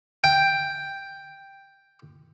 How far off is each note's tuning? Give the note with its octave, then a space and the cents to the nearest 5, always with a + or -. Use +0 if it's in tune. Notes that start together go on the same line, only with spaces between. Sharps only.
G5 +5